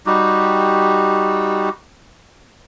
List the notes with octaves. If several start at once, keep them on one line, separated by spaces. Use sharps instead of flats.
G3 D#4 F#4 G4